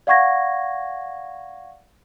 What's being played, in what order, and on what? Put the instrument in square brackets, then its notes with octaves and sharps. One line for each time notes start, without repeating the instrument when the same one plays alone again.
[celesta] D5 F5 F#5 C#6 G#6 A#6